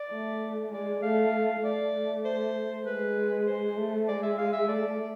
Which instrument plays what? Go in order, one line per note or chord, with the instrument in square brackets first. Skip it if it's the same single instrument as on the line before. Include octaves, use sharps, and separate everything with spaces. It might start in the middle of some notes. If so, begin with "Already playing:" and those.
Already playing: [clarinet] D5
[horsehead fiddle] A3
[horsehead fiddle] G#3 [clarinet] D5
[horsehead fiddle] A3 [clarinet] F5
[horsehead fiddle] A3 [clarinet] D5
[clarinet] C5
[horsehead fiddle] G#3 [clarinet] B4
[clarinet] C5
[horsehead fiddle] A3
[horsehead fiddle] G#3 [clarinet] D5
[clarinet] E5
F5
E5
[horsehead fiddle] A3 [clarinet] D5